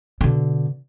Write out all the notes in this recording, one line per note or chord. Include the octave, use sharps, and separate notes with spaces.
B2 D3